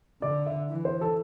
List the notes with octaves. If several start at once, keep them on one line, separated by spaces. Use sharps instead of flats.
D3 D5
E5
E3
C5
A4